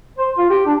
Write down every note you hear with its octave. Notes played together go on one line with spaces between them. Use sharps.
C5
F4
G4
D4